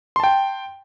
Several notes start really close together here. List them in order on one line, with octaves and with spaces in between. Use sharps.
C6 A5 G5